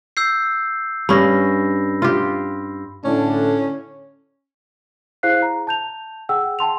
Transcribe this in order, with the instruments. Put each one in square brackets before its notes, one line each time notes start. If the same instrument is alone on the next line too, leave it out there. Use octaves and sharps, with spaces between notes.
[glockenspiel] E6 G6 C7
[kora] G2 C#4 [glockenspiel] B5 A#6
[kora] F4 G4
[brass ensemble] A2 D3 D4 [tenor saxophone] C#4
[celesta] E4 G#4 C5 F5 F#6 C7
A#5
A5 G6 F7
G#4 F#5 G5 E6
G5 A5 C6 F7